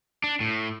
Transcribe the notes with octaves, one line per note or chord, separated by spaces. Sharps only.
D4
A2